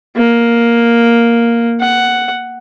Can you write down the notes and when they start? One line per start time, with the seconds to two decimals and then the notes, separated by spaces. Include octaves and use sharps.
0.16 A#3
1.80 F#5